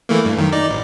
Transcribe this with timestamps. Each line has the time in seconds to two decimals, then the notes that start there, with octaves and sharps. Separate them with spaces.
0.09 E3 A3 A#3
0.25 G2
0.37 F#2 D#3
0.52 D#4 D5
0.70 A1